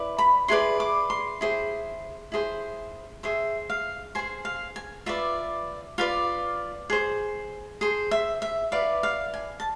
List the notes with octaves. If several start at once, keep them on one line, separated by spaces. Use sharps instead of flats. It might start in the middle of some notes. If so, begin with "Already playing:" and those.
Already playing: E4 B4 D5
B5
E4 G#4 B4 D5 C6
D6
C6
E4 G#4 C5
E4 G#4 C5
G#4 C5 E5
F5
G#4 C5 G#5
F5
G#5
F4 B4 D5 E5
F4 B4 D5 F5
G#4 C5
G#4 C5
E5
E5
E4 B4 D5 F5
F5
G#5
A5